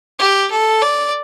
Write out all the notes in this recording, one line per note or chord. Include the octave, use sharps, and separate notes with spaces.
G4
A4
D5